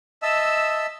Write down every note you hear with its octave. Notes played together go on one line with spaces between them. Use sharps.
D#5 E5 A5 E6